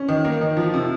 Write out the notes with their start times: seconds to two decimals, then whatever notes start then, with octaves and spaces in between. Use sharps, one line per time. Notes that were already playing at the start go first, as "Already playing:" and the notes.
Already playing: C#4
0.09 D#3
0.25 A#3
0.41 D#3
0.57 F3
0.74 C3